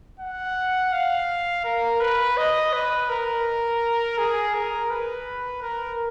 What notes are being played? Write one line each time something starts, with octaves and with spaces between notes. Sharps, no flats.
F#5
F5
A#4
B4
D#5
B4
A#4
G#4
A#4
B4
A#4